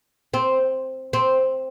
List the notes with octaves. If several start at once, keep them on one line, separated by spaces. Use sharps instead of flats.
C4
C4